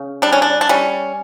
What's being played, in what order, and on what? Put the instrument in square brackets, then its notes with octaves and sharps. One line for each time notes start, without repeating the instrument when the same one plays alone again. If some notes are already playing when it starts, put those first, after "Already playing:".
Already playing: [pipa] C#3
G3 D4
C#4
D4
D4
G3 C#4